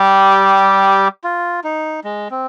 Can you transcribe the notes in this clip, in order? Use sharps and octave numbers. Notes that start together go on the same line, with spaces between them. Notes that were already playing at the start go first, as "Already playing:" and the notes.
Already playing: G3 G4
F4
D#4
G#3
C4